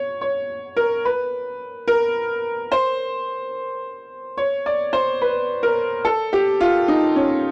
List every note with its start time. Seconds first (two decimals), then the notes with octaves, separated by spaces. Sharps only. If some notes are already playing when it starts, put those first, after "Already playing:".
Already playing: C#5
0.21 C#5
0.77 A#4
1.05 B4
1.88 A#4
2.72 C5
4.37 C#5
4.66 D5
4.93 C5
5.22 B4
5.63 A#4
6.05 A4
6.33 G4
6.61 F4
6.88 D#4
7.16 C#4